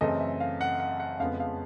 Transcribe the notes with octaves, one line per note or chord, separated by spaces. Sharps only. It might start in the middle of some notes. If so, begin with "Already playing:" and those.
F#2 C#3 E3 A3 C4 D#5
E5
F5
F#5
F#5
F#5
F2 C#3 F3 G#3 B3 F5
F5